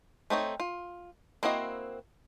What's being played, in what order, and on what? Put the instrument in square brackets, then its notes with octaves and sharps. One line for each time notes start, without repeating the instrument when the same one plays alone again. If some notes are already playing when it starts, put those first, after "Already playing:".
[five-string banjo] A3 C4 D#4 C#5
F4
A#3 C4 E4 F#4 D#5